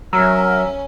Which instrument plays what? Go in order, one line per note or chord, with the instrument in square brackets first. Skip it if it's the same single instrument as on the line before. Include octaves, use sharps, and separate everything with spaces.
[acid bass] F#3 [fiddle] C#4 [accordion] A#4 E5 [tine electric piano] A#5 E6